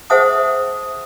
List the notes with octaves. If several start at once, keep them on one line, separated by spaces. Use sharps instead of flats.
G#4 C5 E5 F#5 A5 D#6